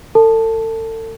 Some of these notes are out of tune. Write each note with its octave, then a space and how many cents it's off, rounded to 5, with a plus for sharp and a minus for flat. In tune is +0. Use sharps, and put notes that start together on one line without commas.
A4 +35 A5 +0